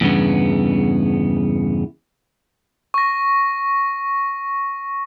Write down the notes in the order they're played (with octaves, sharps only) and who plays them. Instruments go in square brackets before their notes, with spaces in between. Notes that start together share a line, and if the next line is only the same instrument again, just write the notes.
[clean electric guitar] E2 G2 C#3 B3
[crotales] C#6 A#6